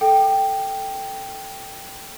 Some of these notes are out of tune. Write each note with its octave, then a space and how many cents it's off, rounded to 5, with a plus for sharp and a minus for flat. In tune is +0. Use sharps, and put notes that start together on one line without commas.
A4 +0 G5 +0